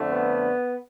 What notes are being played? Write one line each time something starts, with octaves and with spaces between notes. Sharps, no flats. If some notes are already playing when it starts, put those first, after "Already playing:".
Already playing: F2 D3 A3
B3